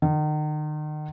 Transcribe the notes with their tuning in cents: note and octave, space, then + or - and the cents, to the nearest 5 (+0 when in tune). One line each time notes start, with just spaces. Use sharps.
D#3 -40